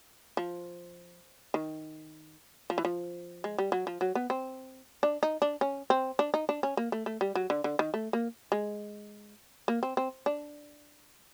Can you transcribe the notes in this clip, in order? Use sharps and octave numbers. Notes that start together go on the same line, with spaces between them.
F3
D#3
F3
E3
F3
G#3
G3
F#3
F3
F#3
B3
C4
D4
D#4
D4
C#4
C4
D4
D#4
D4
C#4
A#3
A3
A3
G3
F#3
D3
D3
D#3
A3
A#3
G#3
A#3
C4
C4
D4